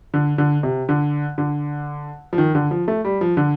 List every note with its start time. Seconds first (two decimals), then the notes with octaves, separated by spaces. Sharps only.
0.14 D3
0.38 D3
0.63 C3
0.89 D3
1.38 D3
2.33 F3
2.38 D#3
2.55 D3
2.71 F3
2.88 A3
3.05 G3
3.21 F3
3.37 D3